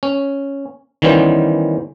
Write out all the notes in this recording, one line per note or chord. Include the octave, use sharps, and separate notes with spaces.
C#4
D#3 E3 G3 B3 C#4 C5